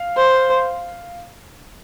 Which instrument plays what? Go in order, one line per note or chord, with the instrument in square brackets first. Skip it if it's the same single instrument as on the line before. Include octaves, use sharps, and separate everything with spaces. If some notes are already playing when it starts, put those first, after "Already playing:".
Already playing: [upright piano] F5
[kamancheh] C5